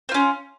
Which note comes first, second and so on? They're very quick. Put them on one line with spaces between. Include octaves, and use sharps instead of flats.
C4 F4 C#4